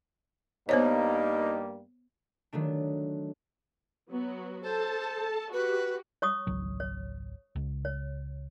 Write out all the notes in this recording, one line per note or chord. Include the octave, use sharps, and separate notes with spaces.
G2 G3 A#3 B3 D#4 C5 C#5
D#3 F#3 A3 D4
F#3 B3 F#4
A4 C5 A5
F#4 G4 B4
C#5 C#6 D#6
G#1 C#2 F#3
C#5
C#2
C#5